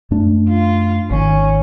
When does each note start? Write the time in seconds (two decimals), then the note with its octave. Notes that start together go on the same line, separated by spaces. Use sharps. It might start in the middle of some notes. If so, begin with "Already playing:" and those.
0.11 F#2 A3 D4
0.49 F4
1.11 G#1 D#3 C#4